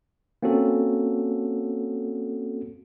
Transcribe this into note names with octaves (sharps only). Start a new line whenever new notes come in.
A#3 C4 C#4 F#4 A4